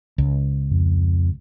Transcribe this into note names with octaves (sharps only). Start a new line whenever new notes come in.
C#2
F2